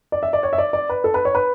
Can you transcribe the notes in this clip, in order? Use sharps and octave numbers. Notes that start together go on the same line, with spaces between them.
D5
E5
D5
C#5
E5
D5
D5
B4
A4
B4
C#5
B4